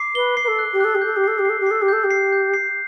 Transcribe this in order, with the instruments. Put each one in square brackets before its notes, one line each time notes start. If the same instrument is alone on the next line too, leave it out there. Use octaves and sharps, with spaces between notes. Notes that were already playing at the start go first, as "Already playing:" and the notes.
Already playing: [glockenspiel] D6 C7
[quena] B4 [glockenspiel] G7
[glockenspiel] C7
[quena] B4
A4
[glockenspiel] F#6
[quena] G4
[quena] A4 [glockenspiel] F#6
[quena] G4
[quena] A4 [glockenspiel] G6
[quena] G4
[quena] A4 [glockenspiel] C7
[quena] G4
[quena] A4 [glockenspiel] C7
[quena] G4
[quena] A4 [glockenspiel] C7
[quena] G4
[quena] A4 [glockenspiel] G6
[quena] G4
[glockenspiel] C7
G6
C7